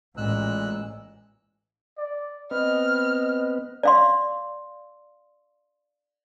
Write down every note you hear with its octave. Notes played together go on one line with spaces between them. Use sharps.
A1 A#2 G#3 E6 F#6
D5
B3 C4 B4 D#5 F6
D5 F5 C6